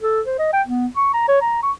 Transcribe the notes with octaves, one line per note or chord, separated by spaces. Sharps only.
A4
C5
D#5
G5
B3
C#6
A#5
C#5
A#5
C#6